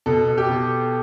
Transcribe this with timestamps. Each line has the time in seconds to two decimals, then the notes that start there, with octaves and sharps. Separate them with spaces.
0.06 B2 A4
0.28 B2
0.38 G4
0.48 B2